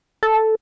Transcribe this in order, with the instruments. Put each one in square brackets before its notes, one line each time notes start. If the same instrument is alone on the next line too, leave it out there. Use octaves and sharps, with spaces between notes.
[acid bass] A4